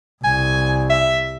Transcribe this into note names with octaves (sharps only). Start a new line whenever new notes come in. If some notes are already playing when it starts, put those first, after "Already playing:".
C2 G#5
E5